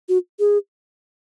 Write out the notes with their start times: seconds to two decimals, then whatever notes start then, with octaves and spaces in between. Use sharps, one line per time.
0.09 F#4
0.40 G#4